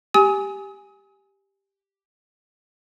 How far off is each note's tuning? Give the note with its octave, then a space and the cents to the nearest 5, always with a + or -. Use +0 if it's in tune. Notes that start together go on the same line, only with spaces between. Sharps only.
G4 +0 G#5 +0 D#6 +40